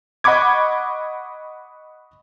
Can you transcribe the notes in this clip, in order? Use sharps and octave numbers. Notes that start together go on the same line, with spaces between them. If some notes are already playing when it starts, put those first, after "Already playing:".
D#5 F#5 B5 C#6 D6 G#6